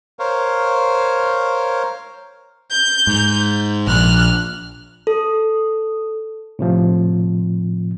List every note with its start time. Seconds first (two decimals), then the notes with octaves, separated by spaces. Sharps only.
0.19 A#4 C5 C#5 F5
2.71 G6
3.07 G#2
3.87 A#1 F6 F#6
5.07 A4
6.59 A2 C3 F3